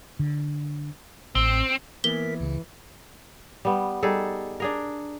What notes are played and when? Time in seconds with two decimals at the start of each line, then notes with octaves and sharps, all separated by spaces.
0.19 D3
1.35 A1 C4
2.04 E3 A#3 B3 A#4 B6 G7
2.40 C#2 C#3
3.65 G3 B3
4.03 G3 D#4 G#4 A4
4.60 D4 G#4 A#4